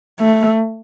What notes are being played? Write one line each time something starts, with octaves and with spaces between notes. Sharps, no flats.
A3